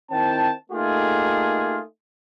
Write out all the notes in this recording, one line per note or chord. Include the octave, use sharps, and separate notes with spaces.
D#3 C4 E4 G5 A5
A3 A#3 D#4 F4 G4 G#4